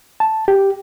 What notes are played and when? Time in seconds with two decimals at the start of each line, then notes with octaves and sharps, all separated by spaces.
0.20 A5
0.48 G4